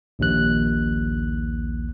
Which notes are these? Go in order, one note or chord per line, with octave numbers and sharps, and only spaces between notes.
A#1 D#2 F#6